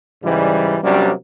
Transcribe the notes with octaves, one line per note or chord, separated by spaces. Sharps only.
G#2 C#3 E3 G3
C3 F#3 G3 A#3 C#4 D4